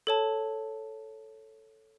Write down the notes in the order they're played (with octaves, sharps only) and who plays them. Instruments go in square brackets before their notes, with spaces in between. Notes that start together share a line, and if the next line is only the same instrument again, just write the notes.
[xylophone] A4 C#5 A5